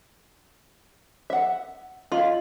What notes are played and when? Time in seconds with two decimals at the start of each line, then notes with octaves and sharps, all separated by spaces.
1.30 E5 F#5
2.12 F4 D#5 F5 C6